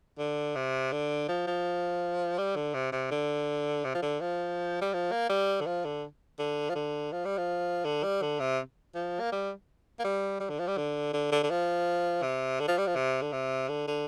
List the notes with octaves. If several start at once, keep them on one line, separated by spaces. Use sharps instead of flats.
D3
C3
D3
F3
F3
G3
D3
C3
C3
D3
C3
F3
D3
F3
G3
F3
A#3
G3
D3
F3
D3
D3
F3
D3
F3
G3
F3
D3
G3
D3
C3
F3
A#3
G3
A#3
G3
G3
D3
F3
G3
D3
D3
D3
D3
F3
C3
D3
F3
G3
F3
C3
D3
C3
D3
D3